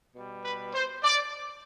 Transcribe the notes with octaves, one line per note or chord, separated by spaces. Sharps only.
B2 G3
B4
C5
D5